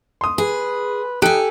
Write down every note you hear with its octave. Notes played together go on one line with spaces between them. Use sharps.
C6 D#6
G#4 B4
D#4 G4 A4 G#5 F#6 D7